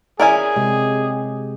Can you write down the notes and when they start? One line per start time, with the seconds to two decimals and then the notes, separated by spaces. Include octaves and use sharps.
0.20 C#4 E4 G#4 A#4 D5 G#5
0.56 C3 G#3 G4